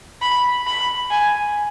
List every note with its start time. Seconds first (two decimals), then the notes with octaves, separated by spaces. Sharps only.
0.22 B5
0.67 B5
1.10 G#5